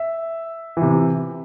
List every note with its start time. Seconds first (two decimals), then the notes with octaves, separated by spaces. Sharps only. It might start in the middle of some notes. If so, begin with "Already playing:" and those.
Already playing: E5
0.77 C3 E3